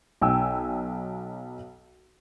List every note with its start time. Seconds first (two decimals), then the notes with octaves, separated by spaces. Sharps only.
0.21 B1 G5 G#5 E6